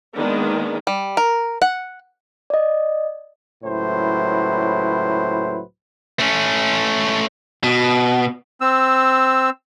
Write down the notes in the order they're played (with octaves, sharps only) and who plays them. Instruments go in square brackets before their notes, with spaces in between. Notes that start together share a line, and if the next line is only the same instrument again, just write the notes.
[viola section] D#3 G#3 A#3 B3 D4
[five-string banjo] G3
A#4
F#5
[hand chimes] D5 D#5
[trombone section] C#2 A2 F#3 E4 B4 C5
[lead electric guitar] A3 C#4
B2
[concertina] C4 E6